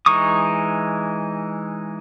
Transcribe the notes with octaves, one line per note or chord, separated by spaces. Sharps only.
E3 G#3 D#4 C#6 D#6